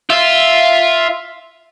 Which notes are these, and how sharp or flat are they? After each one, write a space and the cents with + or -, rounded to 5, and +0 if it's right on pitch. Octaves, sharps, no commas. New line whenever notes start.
F4 +0 E5 +0